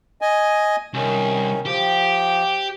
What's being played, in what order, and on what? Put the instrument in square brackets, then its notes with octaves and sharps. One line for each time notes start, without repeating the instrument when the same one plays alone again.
[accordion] D#5 G#5
[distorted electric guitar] C2 [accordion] D#3 C#4
[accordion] F3 [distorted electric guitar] G4